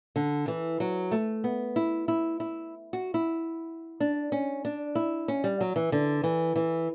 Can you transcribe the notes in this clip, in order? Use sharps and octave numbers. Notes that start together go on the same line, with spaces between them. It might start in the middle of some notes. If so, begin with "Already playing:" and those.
D3
E3
F#3
A3
B3
E4
E4
E4
F#4
E4
D4
C#4
D4
E4
C#4
G3
F#3
E3
D3
E3
E3